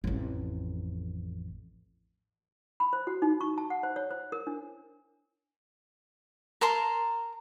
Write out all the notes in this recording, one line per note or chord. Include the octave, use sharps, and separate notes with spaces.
A1 F2
B5
C5
F#4
D#4
C#6
A5
F#5
C5
C#5
C5
A#4
D4
A#4 A5 A#5 C6